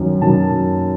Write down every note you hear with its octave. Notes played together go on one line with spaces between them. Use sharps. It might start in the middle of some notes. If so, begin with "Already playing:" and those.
Already playing: F#2 D#3
F#2 D#3 A5